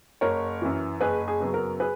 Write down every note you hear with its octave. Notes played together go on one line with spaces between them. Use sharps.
F#1 A#4 C#5
F#2 E3
F#1 G#4 B4
G#4
F#2 C#3 F#3 B3
A#4
G#4 B4